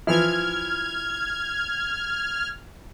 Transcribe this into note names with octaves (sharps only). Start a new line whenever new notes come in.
E3 F3 E4 F6 G#6